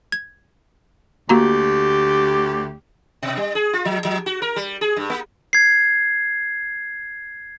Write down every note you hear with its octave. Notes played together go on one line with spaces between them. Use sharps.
G#6
D2 A#3 F#4 G4 A#5
B2
G3
G#4
F4
F3
F3
F#4
A#4
G3
G#4
G2
A#3
G#6 C7